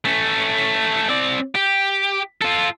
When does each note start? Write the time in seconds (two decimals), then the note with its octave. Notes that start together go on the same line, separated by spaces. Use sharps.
0.05 A3 C#4
1.09 C4 D5
1.55 G4
2.42 F4 A4